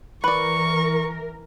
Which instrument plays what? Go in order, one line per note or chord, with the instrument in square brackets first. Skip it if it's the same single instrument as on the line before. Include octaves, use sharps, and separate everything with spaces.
[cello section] E3 A#4 [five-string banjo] B4 D5 [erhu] C#6